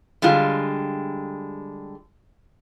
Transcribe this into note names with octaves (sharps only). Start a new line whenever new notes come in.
D3 G3 G#3 F4